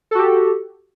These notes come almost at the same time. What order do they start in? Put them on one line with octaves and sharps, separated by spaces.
A4 F#4 G4